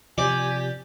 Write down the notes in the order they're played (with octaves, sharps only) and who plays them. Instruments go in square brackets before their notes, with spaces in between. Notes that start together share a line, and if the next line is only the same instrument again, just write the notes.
[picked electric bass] C3 F3 [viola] G4 [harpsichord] D5 [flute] G#5